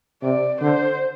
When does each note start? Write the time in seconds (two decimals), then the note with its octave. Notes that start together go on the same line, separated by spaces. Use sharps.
0.23 C3 D5
0.61 D3 C5